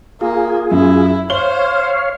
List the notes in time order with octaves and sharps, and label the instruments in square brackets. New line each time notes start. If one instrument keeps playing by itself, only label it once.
[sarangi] A#3 [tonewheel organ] F4 G#4
[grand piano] F#2 [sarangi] E4
[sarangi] C5 [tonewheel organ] C#5 F5 [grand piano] G7